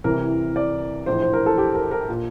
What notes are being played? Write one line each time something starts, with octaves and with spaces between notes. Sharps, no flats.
C2 C3 E3 A#4
D5
A#1 A2 E3 C5
C5
A#4
A4
G4
A#4
A#4
A#2